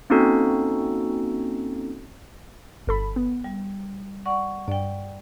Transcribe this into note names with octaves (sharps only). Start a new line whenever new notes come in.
A#3 C4 C#4 D#4 F#4 A4
G1 A4 B5
B3
G3
D5 F#5 C#6
G2 D5 G5